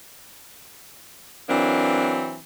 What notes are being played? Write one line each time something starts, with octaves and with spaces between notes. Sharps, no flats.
E3 F#3 A#3 C4 D4